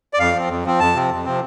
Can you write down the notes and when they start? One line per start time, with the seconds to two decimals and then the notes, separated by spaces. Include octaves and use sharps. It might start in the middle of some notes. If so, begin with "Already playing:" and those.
0.14 D5
0.19 F2 F5
0.34 F3 C4
0.49 F2
0.64 F3 C4
0.80 F2 A5
0.95 C3 F3 C4
1.10 F2
1.25 C3 F3 C4